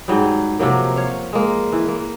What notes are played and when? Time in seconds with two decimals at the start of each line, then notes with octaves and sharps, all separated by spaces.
0.08 G#2 F#3 G3
0.59 C3 F3 F#3 A#3
0.96 C#5 F5
1.33 G#3 A#3
1.72 E3
1.88 A#3